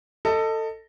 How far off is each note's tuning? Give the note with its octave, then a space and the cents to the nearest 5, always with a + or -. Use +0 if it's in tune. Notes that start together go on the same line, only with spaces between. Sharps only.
A4 +20 D#5 +0